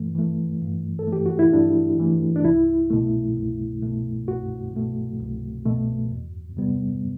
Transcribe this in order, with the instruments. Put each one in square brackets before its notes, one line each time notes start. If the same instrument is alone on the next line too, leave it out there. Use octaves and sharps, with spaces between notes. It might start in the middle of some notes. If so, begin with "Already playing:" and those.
Already playing: [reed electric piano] G2 E3 A3
E3 A3
G2
A4
E3 A3
G4
F#4
E4
G2 D4
E3 A3
D4
C2 E4
B2 A3
C2
B2 A3
C2 F#4
B2 A3
C2
B2 A3
E2
C3 G3 B3